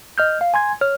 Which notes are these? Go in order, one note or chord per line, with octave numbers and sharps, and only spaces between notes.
D#5 F6 G6
F5
G#5 C6 G#6
C#5 F6